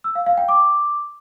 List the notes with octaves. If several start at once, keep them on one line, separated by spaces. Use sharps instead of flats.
E6
F5
F5
G5
D6